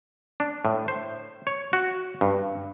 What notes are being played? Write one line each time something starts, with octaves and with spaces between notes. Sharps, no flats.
D4
A2
C5
C#5
F#4
G2